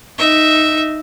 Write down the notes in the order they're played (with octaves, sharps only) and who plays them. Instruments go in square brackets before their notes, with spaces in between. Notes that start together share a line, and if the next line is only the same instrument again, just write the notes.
[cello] D#4 [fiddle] E5